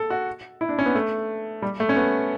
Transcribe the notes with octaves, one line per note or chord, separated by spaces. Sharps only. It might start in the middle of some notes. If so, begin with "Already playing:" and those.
Already playing: A4
F#4
E4
D4
C#4
B3
A3
G3
A3
C#4
B3